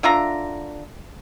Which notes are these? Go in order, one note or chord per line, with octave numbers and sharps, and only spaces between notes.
D3 F4 E5 A#5